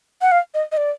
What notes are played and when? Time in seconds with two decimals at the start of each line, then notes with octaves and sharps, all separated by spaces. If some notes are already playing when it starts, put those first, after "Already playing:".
0.22 F#5
0.32 F5
0.54 D#5
0.72 D#5
0.77 D5